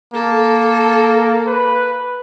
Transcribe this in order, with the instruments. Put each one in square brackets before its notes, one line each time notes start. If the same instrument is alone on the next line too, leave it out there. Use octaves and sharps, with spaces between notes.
[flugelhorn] A#3 [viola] A4
[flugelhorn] B4